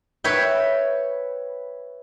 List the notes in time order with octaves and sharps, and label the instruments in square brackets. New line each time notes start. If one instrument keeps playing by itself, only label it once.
[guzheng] B4 C#5 E5 G5